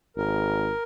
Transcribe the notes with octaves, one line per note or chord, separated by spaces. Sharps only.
G#1 A#4